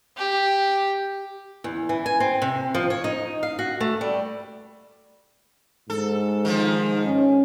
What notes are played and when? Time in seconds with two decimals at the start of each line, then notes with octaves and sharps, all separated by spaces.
0.17 G4
1.64 E2
1.89 E3
2.06 G#5
2.20 C4
2.42 C3
2.75 F3
2.90 C#5
3.04 D#4
3.43 F5
3.59 F#4
3.80 A3
4.01 G3
5.90 G#2 A4
6.45 D#3 F3
7.06 C#4